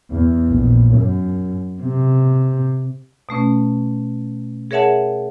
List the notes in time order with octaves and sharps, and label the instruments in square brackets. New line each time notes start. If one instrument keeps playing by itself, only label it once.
[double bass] E2
A#1
F#2
C3
[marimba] B2 A3 C#4
G#4 A#4 C#5 E5 F#5 A5